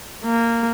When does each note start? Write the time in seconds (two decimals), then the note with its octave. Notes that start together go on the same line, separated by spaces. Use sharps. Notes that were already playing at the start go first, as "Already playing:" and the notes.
0.24 A#3